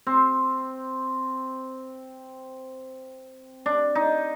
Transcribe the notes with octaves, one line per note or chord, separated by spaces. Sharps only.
C4
D4
D#4